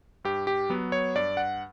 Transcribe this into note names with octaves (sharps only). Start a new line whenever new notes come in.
G2 G4
G4
F#3 B3
C#5
G2 D5
F#5